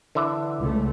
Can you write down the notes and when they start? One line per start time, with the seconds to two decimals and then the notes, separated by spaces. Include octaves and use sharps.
0.15 D3 E3 E5
0.61 C#2 A3